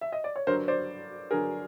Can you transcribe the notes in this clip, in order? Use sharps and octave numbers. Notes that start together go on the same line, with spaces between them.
E5
D#5
D5
C#5
G2 D3 F#3 A#4 C5
C5 D5
G2 D3 F#3 G#4 A#4